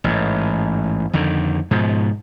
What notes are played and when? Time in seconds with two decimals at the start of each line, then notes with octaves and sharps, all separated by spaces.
0.04 A1 G#2
1.13 F2 D3 D#3
1.71 G#2 B2 F3